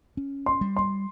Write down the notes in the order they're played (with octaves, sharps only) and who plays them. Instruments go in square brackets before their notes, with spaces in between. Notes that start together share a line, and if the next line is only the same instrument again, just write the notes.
[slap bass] C#4
[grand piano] C6
[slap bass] G3
[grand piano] C6